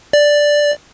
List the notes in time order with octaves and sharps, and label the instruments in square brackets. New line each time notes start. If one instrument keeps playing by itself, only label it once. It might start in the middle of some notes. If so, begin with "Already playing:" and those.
[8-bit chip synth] D5